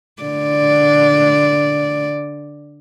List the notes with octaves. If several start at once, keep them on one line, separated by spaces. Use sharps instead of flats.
D3 D5